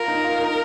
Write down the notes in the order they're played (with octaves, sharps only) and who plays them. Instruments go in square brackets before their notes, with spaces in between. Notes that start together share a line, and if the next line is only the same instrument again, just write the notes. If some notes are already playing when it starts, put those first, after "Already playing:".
Already playing: [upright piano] F4 [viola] A#4
[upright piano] D#4
F4
D#4